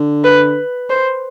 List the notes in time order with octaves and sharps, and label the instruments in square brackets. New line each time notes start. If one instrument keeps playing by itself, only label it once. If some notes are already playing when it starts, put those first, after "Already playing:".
Already playing: [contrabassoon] D3
[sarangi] B4
C5